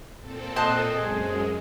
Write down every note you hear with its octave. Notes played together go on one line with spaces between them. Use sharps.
A#2 C4 A4
C5 D#5 A5 F#6
F#2 G#3 G#4